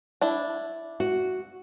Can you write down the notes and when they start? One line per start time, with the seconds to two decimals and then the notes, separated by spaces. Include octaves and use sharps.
0.21 D4 E4
1.00 F#4